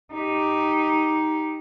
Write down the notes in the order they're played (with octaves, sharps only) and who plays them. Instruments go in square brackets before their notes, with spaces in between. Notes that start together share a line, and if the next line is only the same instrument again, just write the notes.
[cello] D#4 G4